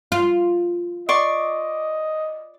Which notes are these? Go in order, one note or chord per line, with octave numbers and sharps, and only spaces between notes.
F4
D5 D#5 C6 C#6